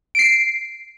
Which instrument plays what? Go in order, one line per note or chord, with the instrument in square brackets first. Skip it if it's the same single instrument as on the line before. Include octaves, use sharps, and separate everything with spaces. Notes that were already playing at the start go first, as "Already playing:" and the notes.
[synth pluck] C7 D7